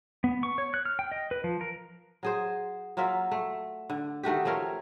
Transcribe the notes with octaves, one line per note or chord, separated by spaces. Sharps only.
B3
C#6
C#5
F#6
F6
G5
D#5
B4
F3
A#4
F#3 G#4 C5
F#3 A#3 F4 E5
A3
D3
D#3 A3 F#4 G4
F3 A3 C#4 A#4